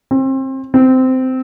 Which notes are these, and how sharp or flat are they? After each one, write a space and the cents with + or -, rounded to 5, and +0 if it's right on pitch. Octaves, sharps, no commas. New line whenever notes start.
C4 +30
C4 -15